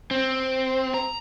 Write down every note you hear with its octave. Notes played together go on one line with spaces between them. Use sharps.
C4
A#5